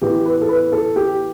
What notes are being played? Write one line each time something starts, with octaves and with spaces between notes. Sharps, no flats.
A2 E3 B3 G4
B4
A4
B4
A4
G4